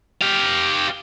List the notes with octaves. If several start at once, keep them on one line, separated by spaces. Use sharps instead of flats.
G4 F5